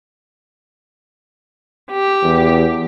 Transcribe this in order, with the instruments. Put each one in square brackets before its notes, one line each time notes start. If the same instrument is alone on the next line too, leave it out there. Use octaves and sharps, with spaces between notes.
[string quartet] G4
[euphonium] E2